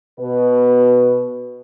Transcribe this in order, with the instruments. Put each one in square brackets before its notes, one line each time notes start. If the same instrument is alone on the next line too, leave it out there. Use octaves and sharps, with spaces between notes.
[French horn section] B2 B4